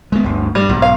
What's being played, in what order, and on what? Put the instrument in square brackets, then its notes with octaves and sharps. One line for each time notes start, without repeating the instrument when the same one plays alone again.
[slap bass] G#3 B3
G1 D2
[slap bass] G2 [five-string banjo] G3
[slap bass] B1 G#2
[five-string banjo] F5